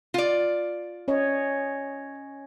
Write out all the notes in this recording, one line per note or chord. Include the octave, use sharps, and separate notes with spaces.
F4 D5
C#4 C#5 D#5